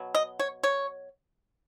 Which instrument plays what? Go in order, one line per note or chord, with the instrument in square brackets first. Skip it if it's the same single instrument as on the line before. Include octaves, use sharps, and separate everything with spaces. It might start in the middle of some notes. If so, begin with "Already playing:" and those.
Already playing: [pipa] B2 F#3
D#5
C#5
C#5